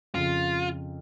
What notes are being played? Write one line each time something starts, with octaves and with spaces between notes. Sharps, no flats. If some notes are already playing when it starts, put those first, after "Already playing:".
F2 C#3 F3 F4